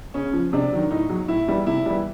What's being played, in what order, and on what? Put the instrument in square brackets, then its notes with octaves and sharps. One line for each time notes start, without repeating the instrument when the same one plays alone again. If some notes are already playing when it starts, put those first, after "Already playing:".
[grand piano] C#3 C#4
F3
C3 D4
D#3 F#3
A2 D#4
F#3
A2 E4
E3 G3
C3 E4
E3 G3